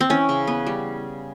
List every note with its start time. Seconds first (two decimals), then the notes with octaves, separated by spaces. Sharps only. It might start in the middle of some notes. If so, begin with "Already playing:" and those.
0.01 C4
0.10 E3 C#4
0.29 C#3
0.47 B3
0.66 G3